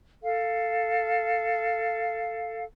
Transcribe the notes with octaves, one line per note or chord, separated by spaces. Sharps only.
A4 F5